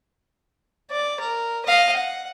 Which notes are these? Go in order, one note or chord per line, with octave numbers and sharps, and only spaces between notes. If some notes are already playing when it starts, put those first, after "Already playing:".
D5
A#4
D#5 F5
F#5